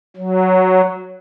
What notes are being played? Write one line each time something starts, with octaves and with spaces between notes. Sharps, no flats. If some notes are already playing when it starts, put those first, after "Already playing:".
F#3